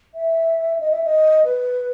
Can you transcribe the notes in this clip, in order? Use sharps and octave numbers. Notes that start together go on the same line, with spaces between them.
E5
D#5
E5
D#5
B4